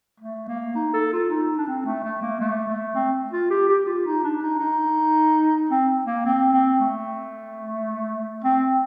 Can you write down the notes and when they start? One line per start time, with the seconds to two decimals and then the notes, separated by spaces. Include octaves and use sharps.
0.20 A3
0.49 A#3
0.76 D#4
0.94 A4
1.13 F4
1.30 D#4
1.58 D4
1.67 C4
1.85 A3
2.04 A3
2.22 A#3
2.40 A3
2.68 A3
2.95 C4
3.33 F4
3.51 G4
3.69 G4
3.86 F4
4.06 D#4
4.24 D4
4.42 D#4
4.60 D#4
5.71 C4
6.07 A#3
6.25 C4
6.52 C4
6.80 A3
8.44 C4